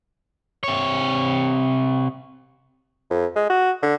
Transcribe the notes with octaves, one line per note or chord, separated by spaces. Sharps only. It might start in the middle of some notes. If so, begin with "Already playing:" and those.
C3 C#5
F2
G#3
F#4
D3